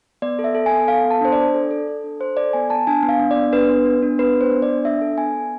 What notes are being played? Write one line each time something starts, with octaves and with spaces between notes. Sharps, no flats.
B3 D5
A4
E5
A4
G#5
B3
A4 F5
B3
A5
D4 C5
D5
D4
A4
A4
A4
D4
A4 C5
A4 D5
B3 G#5
B3 A5
D4 G#5
B3
F5
D4
B3 D5
D4 B4
B3
B3
D4
B3 B4
D4 C5
B3
D5
D4
D4 E5
A4
B3 G#5
B3